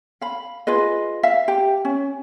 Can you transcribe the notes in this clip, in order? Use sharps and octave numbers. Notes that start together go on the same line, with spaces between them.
F5 B5
F4 G#4 B4 D#5
E5 F5
G4
C#4